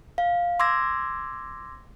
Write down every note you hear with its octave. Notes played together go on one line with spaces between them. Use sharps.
F5
C6 D6 E6 G#6 A#6